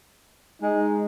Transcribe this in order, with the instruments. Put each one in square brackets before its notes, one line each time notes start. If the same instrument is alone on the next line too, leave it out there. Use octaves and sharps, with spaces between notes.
[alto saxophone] G#3 [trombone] D#4